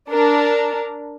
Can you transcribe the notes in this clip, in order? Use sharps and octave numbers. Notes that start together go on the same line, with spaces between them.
D4 A#4